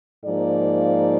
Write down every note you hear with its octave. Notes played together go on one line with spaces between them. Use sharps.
G#2 F3 A#3 D5